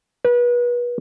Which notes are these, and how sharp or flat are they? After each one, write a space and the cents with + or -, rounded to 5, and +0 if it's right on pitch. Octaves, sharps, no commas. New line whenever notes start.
B4 -30